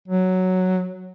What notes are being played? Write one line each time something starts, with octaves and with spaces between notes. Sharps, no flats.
F#3